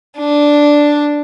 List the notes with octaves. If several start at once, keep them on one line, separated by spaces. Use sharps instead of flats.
D4